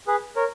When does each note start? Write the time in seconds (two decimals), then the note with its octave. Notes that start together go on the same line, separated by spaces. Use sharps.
0.07 G#4 B4
0.36 A#4 C#5